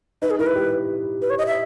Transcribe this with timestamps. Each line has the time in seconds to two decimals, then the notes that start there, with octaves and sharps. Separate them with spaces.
0.22 D#4 B4
0.30 G#4
0.39 E4 A#4
0.46 B4
0.55 G4
1.22 B4
1.30 C#5
1.38 D#5
1.47 E5